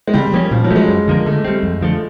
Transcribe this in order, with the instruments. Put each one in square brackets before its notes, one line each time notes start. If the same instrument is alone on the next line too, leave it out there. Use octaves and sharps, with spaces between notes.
[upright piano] G#3
[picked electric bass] C#3 [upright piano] G3
[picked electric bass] F3 A#3 C#4
[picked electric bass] A#2 [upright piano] F3
[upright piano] F#3
[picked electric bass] F3 A3 C#4
[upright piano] G#3
[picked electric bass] F#2
D3 F3 A#3
[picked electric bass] D3 [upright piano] A3
[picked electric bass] G3 C4
F2
D3 F3 A3